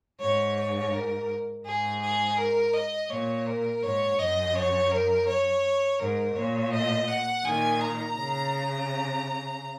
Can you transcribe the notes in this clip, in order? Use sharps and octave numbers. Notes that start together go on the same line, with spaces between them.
G#2 C#5
C#5
A#4
G#2 G#4
G#4
A#4
D#5
A#2 C#5
A#4
G#2 C#5
F#2 D#5
C#5
A#4
C#5
G#2 A#4
A#2 C#5
D#5
F#5
A#2 D#3 G#5
A#5
C#3